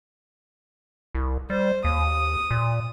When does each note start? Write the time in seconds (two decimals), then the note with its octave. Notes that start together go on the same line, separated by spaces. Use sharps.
1.15 C2
1.50 G3 C5
1.84 D#2 D#6
2.51 A#2